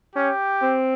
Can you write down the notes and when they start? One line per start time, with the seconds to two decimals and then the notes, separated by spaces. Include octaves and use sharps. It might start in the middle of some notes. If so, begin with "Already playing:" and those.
0.16 C#4 G4
0.62 C4